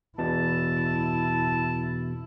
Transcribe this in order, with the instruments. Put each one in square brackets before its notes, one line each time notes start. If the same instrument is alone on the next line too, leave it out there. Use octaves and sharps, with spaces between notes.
[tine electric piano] E2 B2 [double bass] E4 [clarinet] A5